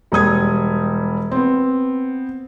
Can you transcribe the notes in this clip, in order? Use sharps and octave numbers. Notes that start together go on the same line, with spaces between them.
E1 G3 D#6 G#6
B3 C4